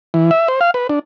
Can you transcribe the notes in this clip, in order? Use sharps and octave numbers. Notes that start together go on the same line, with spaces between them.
E3
E5
C5
F5
B4
D4